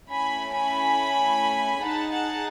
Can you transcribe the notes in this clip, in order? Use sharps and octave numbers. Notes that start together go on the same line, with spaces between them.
A3 C#4 E4 G#5 B5
G#5 B5
D#4 G#4 F#5 A5
F#5 A5